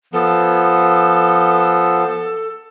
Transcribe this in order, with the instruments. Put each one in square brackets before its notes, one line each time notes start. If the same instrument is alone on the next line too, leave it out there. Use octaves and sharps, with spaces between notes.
[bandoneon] F3 B3 [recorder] A4